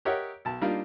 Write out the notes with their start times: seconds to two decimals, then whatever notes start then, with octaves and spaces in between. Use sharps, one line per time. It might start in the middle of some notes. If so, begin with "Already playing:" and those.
0.05 G4 A#4 C#5 D#5 E5 F#5
0.45 B1 A5
0.61 G3 A#3 D4 D#4 F4